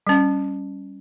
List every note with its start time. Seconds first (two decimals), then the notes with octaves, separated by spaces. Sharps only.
0.07 G3 C#4